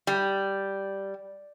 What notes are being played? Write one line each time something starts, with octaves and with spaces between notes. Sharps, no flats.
G3